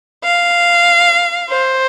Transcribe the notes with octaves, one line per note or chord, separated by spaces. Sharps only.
F5
C5